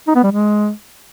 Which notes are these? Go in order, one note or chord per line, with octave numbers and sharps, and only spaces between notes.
D#4
B3
G3
G#3